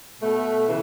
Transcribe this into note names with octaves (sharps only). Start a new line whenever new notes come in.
B2 A3
C#3 E3